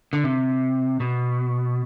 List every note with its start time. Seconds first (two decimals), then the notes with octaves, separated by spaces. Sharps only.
0.13 D3
0.24 C3
1.00 B2